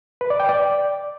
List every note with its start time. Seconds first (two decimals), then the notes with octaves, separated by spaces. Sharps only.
0.21 B4
0.30 D5
0.40 G5
0.49 D5